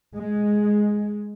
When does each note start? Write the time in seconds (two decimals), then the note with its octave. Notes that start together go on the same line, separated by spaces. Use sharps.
0.16 G#3